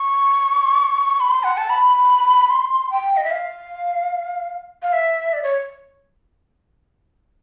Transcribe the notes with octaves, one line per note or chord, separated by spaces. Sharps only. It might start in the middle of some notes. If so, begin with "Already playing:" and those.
Already playing: C#6
B5
C6
F#5
A5
B5
C6
G5
D#5
E5
F5
F5
E5
D5
C#5